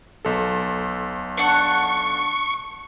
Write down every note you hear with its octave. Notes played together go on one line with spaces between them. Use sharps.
B1 A4
D4 F#5 C#6